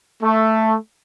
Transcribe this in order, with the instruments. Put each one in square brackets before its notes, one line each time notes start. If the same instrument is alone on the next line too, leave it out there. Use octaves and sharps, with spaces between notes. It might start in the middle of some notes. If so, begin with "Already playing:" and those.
[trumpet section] A3